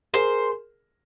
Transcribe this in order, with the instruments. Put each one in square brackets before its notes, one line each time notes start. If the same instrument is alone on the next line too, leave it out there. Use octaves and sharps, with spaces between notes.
[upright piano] G#4 A#4 [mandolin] C5